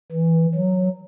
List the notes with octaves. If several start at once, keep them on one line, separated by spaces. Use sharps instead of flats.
E3
F#3